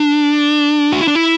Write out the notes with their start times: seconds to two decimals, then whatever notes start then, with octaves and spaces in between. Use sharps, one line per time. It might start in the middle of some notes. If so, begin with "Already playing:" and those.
Already playing: D4
0.92 F#4
1.01 E4
1.08 D4
1.15 E4